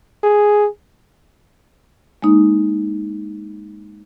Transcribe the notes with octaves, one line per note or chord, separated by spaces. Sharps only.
G#4
G#3 A#3 D#4